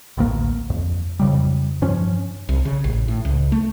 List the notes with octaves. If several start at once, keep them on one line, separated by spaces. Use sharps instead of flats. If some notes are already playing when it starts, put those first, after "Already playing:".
A1 D2 A#3
F2
F2 C#3 G3
G2 F3 C#4
C2
C#3
A1
A2
C#2
A3